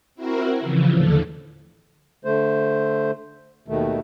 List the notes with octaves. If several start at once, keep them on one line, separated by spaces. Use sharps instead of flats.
C4 E4 F#4 A#4
C#3 E3 F3
D#2 A2 D3 A4
D3 A3 C5
D#2 B2 D#3 A3